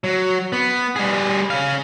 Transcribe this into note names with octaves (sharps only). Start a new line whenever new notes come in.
F#3
B3
G3 G#4
C#3 F5